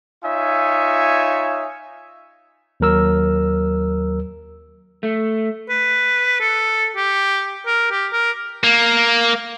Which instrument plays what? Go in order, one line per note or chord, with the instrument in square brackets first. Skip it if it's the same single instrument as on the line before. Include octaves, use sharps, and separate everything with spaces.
[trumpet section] D#4 F4 C#5 E5 G#5
[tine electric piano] D#2 F#3 A#4 E6
[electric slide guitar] A3
[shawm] B4
A4
G4
A#4
G4
A#4
[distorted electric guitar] A#3